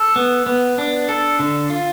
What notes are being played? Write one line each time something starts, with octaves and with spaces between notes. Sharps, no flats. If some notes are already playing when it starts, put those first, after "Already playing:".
Already playing: A4
B3
B3
D4
A4
D3
F4